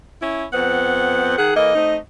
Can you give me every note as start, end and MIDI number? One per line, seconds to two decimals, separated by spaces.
0.22 0.44 61
0.22 0.44 64
0.53 1.34 41
0.53 1.35 59
0.53 1.34 60
0.53 1.34 78
1.38 1.53 51
1.38 1.52 68
1.38 1.53 78
1.56 1.74 52
1.56 1.74 58
1.56 1.74 69
1.56 1.97 75
1.75 1.97 57
1.75 1.97 60
1.75 1.97 63